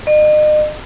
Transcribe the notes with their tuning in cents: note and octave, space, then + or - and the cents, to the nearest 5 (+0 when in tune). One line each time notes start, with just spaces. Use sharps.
D#5 -40